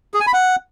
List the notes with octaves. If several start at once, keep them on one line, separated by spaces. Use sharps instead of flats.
G#4
G#5
B5
F#5